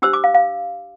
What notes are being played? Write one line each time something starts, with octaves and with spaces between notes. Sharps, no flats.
D4 G4 C5 E6
D6
F5
F5